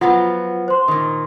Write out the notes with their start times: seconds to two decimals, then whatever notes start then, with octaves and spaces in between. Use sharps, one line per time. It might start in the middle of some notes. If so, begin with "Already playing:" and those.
0.01 F3 F#3 B3 F4 F#5
0.68 C5 C6
0.88 A#2 D#3